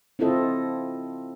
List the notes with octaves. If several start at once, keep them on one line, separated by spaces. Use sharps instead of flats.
C4 E4 F4 A4 D#5